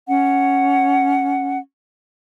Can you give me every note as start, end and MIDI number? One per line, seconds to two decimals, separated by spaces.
0.07 1.57 61
0.07 1.57 78